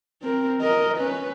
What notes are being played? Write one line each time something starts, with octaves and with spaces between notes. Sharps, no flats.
C4 A#4
A#4 D#5
C#4 B4